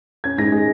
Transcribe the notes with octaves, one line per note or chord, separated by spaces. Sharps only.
C#4 G#6
G#2 A#6
G#3